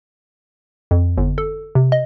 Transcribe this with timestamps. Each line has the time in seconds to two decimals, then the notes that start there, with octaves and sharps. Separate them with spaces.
0.91 F2
1.18 G1
1.38 A4
1.75 C3
1.92 D#5